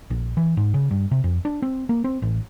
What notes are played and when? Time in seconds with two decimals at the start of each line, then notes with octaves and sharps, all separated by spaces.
0.10 A#1
0.37 E3
0.57 G#2
0.74 C#3
0.91 G2
1.11 C3
1.24 F2
1.45 D4
1.62 C4
1.89 A#3
2.04 C4
2.22 A1